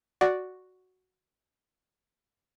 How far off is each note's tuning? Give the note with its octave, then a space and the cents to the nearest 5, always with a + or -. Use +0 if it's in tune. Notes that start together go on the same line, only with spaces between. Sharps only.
F#4 +0 D5 +0